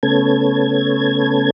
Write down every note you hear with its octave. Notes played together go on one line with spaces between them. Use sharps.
C#3 A3 B3 C#4 A4 G#6